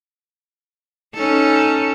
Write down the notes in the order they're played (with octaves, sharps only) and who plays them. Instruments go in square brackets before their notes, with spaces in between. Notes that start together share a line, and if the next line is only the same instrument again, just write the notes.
[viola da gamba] C#4 D#4 A4